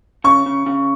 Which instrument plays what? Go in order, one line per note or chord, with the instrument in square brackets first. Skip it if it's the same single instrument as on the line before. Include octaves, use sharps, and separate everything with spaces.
[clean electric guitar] C#3 [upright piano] C#6
[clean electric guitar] C#3
C#3